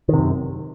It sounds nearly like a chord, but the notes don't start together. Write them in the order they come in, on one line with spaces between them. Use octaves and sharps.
D#3 C3 F#2